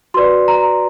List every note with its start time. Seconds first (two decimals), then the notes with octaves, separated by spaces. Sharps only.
0.14 F#4 B4 D5 C6
0.48 A#5